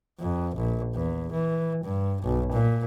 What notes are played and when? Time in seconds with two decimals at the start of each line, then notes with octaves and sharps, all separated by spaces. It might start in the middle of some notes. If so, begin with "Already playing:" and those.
0.19 F2
0.56 A#1
0.94 E2
1.32 E3
1.84 G2
2.23 B1
2.52 A#2